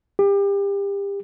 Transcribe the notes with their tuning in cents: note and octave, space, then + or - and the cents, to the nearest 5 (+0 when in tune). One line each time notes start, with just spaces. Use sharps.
G4 +30